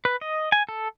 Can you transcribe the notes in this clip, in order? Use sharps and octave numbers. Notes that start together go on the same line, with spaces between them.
B4
D#5
G#5
A4